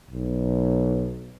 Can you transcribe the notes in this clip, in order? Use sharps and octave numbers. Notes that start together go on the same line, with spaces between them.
B1